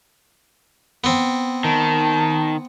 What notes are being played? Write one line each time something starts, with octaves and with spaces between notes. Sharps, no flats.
B3 C4
D#3 A5